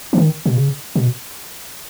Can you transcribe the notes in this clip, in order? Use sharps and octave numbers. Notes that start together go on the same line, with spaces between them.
E3
D#3
B2
C#3
B2